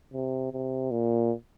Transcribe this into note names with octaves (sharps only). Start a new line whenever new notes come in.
C3
C3
A#2